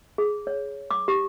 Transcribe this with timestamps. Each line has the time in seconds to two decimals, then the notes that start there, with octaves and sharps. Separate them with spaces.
0.18 G#4
0.47 C#5
0.91 D6
1.08 G4